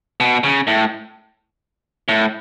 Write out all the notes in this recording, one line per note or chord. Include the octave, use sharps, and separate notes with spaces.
B2
C#3
A2
A2